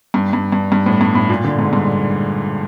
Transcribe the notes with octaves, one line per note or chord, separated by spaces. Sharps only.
G2
G2
G2
G2
A2
G2
A2
A#2
D3
G#2
G2